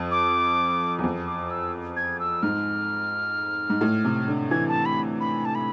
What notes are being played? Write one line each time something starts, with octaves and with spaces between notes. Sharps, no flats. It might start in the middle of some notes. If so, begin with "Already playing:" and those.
Already playing: F2
D6
E2
F2
D6
E6
G#6
E6
G#2 F6
G#2
A2
C3
D3
E3 G#6
A5
B5
B5
A5
B5